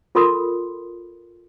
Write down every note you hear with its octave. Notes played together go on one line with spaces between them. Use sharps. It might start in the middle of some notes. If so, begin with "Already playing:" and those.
F4 A4 A#4 B5 C6 D#6